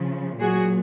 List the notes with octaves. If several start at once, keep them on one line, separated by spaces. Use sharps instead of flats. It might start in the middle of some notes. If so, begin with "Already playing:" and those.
Already playing: C#3 F3
A#2 F#3 F#4 G#4